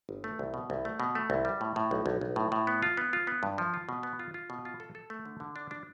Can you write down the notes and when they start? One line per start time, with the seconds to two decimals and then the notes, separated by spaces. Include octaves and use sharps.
0.09 G1
0.24 A3
0.39 C2
0.54 B2
0.70 C2
0.85 A3
1.00 B2
1.15 A3
1.30 C2
1.45 G3
1.61 A2
1.76 A2
1.91 B1
2.06 B1
2.21 B1
2.36 A2
2.52 A2
2.67 B3
2.82 F4
2.97 B3
3.13 F4
3.27 B3
3.43 G2
3.58 F3
3.74 F4
3.89 B2
4.03 B3
4.19 F4
4.34 F4
4.50 B2
4.65 F4
4.80 A4
4.95 A4
5.10 A3
5.26 D3
5.40 D3
5.56 D4
5.71 D4